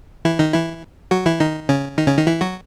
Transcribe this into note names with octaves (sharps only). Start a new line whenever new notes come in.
E3 E4
D#3 D#4
E3 E4
F#3 F#4
E3 E4
D#3 D#4
C#3 C#4
D#3 D#4
C#3 C#4
D#3 D#4
E3 E4
F#3 F#4